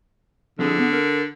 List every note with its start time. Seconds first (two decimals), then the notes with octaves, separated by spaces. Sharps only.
0.59 D3 F3 C4 G#4
0.79 B3
0.93 A#4